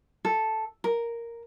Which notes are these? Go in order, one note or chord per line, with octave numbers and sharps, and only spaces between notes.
A4
A#4